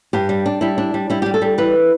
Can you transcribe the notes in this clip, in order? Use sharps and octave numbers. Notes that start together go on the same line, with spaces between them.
G2 G4
G3
D4
G3 E4
D4
G3
G3 E4
G4
G3
A4
G3
E3 B4